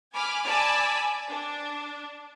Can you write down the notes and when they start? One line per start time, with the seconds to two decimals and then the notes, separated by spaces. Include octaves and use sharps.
0.13 G#5 B5 D6 F6
0.45 D5 G#5 A5 B5 D6 E6
1.30 D4